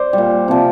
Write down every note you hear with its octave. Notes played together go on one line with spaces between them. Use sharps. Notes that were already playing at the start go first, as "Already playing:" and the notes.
Already playing: C5 D5
A#2 G3
C3 F3